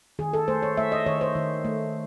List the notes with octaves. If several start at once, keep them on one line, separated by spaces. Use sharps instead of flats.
D#3 G#4
A4
A3 C5
C#5
A3 E5
D#5
D#3 C#5
C5
D#3
A3